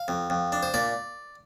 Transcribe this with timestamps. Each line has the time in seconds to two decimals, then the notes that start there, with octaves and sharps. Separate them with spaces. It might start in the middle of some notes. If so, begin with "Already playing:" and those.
Already playing: F5
0.08 F2
0.30 F2
0.52 D4
0.63 C5
0.74 A#2 D5